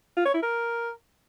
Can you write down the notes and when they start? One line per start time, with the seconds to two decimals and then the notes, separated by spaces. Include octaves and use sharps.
0.17 F4
0.25 C#5
0.34 E4
0.43 A#4